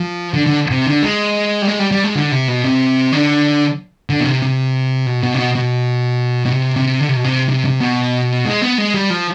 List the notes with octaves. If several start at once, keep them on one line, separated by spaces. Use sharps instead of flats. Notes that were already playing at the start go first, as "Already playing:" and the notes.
Already playing: F3
D3
D3
C3
D3
G#3
G3
G#3
G3
G3
G#3
D3
C3
B2
C3
D3
D3
B2
C3
C3
B2
B2
C3
B2
B2
B2
C3
C3
D3
C3
B2
C3
C3
C3
B2
G#3
B3
G#3
G3
F3